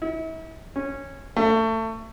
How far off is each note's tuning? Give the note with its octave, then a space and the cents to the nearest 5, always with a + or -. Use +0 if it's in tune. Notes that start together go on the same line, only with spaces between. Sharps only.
E4 -40
C#4 -15
A3 +25